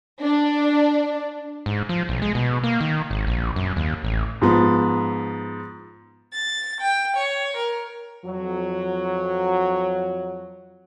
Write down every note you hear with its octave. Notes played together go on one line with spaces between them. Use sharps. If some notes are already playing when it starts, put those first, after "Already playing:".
D4
G#2
F3
B1
G#3
B2
A#3
D#3
G#1
A#1
F#2
D#2
A1
G#2 F3 B3
A6
G5
C#5
A#4
F2 F#3